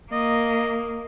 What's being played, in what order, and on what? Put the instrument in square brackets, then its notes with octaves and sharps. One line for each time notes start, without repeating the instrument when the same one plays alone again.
[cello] A#3 [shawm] D#5